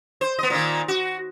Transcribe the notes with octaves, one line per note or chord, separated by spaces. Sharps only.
C5
B3 D#5
A#2 D#3
F#4